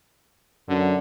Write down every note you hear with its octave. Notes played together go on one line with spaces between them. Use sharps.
F#2 D3